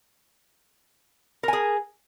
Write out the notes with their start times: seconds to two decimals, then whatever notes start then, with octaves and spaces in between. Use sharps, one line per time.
1.43 A#4
1.48 G#5
1.53 G#4